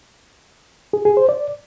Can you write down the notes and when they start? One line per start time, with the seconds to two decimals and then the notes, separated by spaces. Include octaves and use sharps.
0.93 G#4
1.05 G#4
1.17 C5
1.29 D5